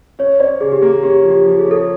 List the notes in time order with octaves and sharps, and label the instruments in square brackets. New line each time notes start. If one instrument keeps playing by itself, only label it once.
[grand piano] C#4 [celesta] C#5
[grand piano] C#4 [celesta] C5 D5
[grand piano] C#3 [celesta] G#4
[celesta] G4
[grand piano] A#3 [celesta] G#4
[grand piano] C#4 [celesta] G4
[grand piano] F3
[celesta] G4
[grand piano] F3
[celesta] G#4
[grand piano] C#4
[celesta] A4